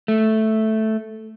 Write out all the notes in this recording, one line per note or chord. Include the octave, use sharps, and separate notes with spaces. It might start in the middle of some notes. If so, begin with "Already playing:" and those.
A3